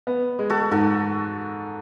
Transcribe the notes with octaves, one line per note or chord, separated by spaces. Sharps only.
B3
G#3
F#4 A4
G#2 F#4 A4